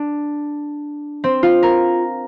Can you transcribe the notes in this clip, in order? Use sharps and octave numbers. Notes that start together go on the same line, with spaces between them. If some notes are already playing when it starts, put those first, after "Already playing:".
Already playing: D4
C4
F4
A#4